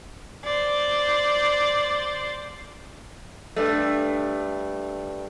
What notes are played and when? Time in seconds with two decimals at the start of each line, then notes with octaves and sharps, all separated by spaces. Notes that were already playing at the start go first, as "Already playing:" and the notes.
0.45 C5 D5
3.56 G2 A3